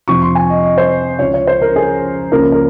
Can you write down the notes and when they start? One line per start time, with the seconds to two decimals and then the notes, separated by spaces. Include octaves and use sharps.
0.08 F2 C3 F3 C#6
0.22 C6
0.35 G#5
0.50 D#5
0.63 D#5
0.78 C5
1.19 C#2 C#3 F3 C#5
1.34 C#5
1.47 C5
1.62 A#4
1.76 G#4
2.32 C#2 C#3 F3 A#3 A#4
2.52 A#4